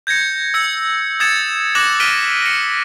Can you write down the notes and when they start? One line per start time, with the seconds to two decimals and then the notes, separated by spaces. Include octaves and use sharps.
0.07 G6 G#6 A#6 C#7
0.54 E6 G#6 C#7
1.20 D#6 G#6 A6 C#7 E7
1.75 D6 F#6 A#6 C#7 E7 F#7
2.00 F6 F#6 B6 D7 D#7 G7
2.42 A#6 C#7